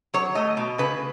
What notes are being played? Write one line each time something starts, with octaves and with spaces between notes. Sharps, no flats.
F#3 C#5
A3 D#5
B2
C#3 B4